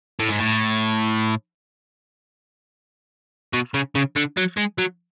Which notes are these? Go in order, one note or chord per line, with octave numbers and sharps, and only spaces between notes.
A2
G#2
A2
B2
C#3
C#3
D3
F#3
G#3
F#3